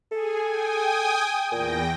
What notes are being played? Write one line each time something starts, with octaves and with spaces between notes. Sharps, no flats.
G#4 A4 G#5
G5 G#5 D#6
E2 A#2 G5 A#6